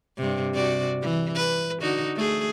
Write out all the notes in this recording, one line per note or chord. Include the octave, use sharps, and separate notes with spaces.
G2 C3
C3 F#4 D5
E3
B4
D3 D#4 F#4
A3 G#4